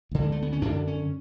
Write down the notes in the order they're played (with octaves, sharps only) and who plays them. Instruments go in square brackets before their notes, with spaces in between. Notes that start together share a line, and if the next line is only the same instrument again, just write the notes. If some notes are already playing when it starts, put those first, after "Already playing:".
[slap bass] D2 D3
G#3
A3
B3
C#4
F#2 D3 D4
C#4